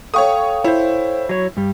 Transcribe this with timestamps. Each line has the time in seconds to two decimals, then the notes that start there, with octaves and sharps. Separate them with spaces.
0.14 A4 C#5 F5 G5 C#6 D#6
0.64 E4 C5 C#5
1.29 F#3 C#5
1.57 G2 G3